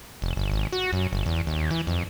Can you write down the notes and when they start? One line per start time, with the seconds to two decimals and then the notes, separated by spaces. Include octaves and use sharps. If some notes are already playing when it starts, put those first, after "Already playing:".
0.22 F1
0.36 G1
0.51 G#1
0.72 F#4
0.93 F#2
1.12 G1
1.26 E2
1.47 D#2
1.71 E3
1.87 F2